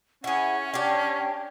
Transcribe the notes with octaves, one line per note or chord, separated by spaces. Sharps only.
C#4 E4 G#4 F#5
D4 G4 G5